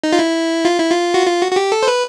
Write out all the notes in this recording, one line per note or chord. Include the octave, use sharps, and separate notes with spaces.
D#4
F4
E4
F4
E4
F4
F#4
F4
F#4
F#4
G4
A4
C5
B4